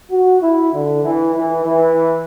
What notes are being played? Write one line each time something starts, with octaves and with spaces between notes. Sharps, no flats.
F#4
E4
D3
E3
E3
E3